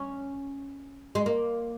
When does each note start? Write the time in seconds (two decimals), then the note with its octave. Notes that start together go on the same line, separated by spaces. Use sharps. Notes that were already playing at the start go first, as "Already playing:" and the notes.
Already playing: C#4
1.15 G#3
1.26 A#3